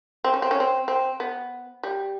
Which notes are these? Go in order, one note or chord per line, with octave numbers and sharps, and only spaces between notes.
C4
C#4
C4
C#4
C4
C4
B3
G3